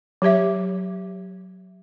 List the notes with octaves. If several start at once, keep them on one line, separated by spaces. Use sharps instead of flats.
F#3 G4 C#5 E5